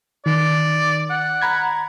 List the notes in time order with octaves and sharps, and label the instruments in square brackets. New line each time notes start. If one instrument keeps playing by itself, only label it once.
[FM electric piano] D#3 [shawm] D5
[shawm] F#5
[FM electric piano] A#5 B5 G#6